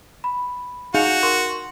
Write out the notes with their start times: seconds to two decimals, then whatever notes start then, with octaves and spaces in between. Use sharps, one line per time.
0.24 B5
0.94 D#4 F#4 G#4 F5 G6 C#7 F7
1.23 A#4 C6 C#6